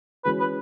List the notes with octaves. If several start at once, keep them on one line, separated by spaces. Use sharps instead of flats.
E3 G#3 C#4 F#4 B4
B4